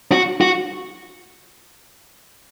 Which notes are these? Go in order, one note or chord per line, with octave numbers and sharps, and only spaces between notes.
F#4
F#4